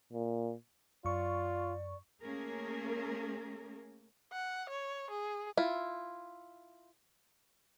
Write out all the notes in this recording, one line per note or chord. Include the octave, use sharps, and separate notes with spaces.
A#2
F#2 F4 D5 C#6
A3 A#3 C#4 G#4 A#4
F#5
C#5
G#4
E4 F4